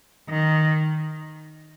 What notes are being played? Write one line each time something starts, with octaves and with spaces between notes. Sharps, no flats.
D#3